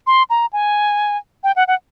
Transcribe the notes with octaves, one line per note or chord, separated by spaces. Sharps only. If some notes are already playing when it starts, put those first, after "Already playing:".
C6
A#5
G#5
G5
F#5
F#5